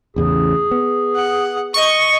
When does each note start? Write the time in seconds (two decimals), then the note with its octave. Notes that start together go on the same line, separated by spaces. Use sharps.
0.16 A1 E2 C#3 G#4
0.71 B3
1.16 F#5
1.74 D#5 C#6